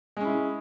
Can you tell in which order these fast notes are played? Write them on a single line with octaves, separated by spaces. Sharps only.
G#3 C#4 E4